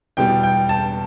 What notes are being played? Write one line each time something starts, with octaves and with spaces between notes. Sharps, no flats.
E2 B2 G3 G5
G5
A5